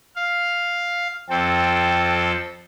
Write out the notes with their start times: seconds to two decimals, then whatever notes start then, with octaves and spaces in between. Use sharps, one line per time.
0.16 F5
1.30 F2 C4 A4 G5